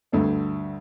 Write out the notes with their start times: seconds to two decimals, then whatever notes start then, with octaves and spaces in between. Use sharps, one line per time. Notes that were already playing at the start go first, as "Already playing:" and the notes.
0.12 D2 G2 A3